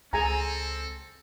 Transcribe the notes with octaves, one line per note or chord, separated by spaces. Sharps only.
C#2 C4 G#4 A4 G#5 A#5